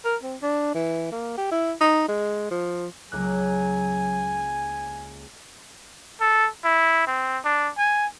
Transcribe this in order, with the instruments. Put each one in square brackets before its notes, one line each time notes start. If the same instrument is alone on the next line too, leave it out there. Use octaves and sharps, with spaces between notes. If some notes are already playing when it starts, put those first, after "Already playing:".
[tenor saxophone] A#4
C4
D4
E3
A#3
G4
E4
D#4
G#3
F3
[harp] C#2 A#3 F#6 [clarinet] F#3 [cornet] G#5
[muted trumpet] A4
E4
C4
D4
G#5